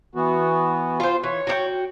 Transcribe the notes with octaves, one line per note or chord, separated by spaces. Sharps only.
E3 B3 F#4
F4 C5
E3 C#5
F#4 G4 G5